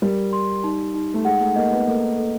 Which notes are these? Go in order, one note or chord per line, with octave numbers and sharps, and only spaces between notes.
G3 A#4
C6
D#4
D#4
A3
G#3 F#5
A3
A#3 D#5
B3
A#3 A4
A4